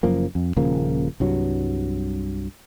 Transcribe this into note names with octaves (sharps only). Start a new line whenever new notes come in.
F#1 F#2 F3 A#3
F2
D#1 C#3 F3 A#3
C2 G2 F#3